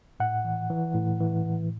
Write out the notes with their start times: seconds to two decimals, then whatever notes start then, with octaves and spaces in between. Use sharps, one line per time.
0.20 A2 F#5
0.45 E3
0.70 E3
0.95 A2
1.20 E3
1.45 A2